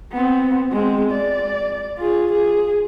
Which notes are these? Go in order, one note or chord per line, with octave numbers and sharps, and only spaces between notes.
B3 C4
G#3 C4
D5
F4 G#4
G#4